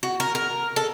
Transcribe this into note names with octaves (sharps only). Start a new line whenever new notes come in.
F#4
A#4
A#4
A4